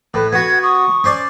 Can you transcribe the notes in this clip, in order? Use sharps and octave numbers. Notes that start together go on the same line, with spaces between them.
A2 B4
B3 F#4 F#5 G#6
C#6 D#6
C#4 C5 D5